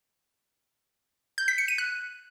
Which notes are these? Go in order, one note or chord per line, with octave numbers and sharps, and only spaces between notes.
G6
B6
C#7
D#7
F#6